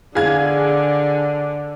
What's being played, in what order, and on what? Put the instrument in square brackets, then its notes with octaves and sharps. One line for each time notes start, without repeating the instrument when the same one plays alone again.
[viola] D3 [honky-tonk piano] G#4 F5 G#6